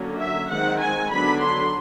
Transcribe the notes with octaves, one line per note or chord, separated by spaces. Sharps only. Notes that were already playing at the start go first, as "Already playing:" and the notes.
Already playing: D3 F#3 A#3 C#4
E5
D#3 G#3 C4 F#5
G#5
D3 F#3 B3 D4 B5
C6